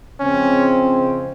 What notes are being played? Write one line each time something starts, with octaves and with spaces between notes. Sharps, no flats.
C#3 F3 G#3 C4 C#4